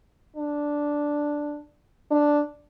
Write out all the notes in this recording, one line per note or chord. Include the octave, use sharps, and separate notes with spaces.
D4
D4